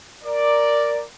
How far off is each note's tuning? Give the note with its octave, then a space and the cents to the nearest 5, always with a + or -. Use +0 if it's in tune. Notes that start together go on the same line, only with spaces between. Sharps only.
A#4 +0 D5 +0